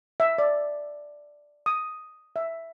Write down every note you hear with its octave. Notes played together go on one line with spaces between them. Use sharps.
E5
D5
D#6
E5